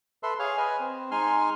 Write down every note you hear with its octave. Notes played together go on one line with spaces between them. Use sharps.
A4 B4 E5 C6
G#4 C#5 F5
B4 D#5 G#5
C4
G#3 D#4 G#5 C6 F6